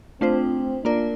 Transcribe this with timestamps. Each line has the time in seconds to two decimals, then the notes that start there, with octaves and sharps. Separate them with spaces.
0.20 A3 C4 D4 F4 C5
0.84 A#3 D4 F4 A#4 D5